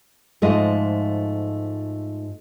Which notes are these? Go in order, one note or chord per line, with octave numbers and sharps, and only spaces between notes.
G#2 F3 A3 F4 D#5